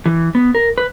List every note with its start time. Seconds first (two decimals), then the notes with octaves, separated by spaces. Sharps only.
0.06 E3
0.35 B3
0.55 A#4
0.78 B4